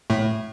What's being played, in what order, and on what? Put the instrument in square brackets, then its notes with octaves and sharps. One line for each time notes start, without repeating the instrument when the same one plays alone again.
[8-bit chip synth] A2 A3